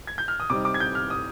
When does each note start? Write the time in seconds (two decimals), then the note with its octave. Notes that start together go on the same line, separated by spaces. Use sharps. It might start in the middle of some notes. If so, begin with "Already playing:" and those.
0.07 G#6
0.18 G6
0.28 F6
0.40 D#6
0.50 C3 G3 C4 D#4 D6
0.65 D6
0.74 G#6
0.80 G6
0.95 F6
1.10 D#6